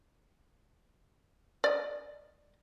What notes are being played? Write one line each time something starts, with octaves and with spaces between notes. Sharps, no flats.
D5 D#5